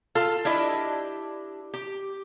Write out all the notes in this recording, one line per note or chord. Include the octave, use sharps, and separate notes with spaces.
F4 A4
D4 E4 G4 D#5
G4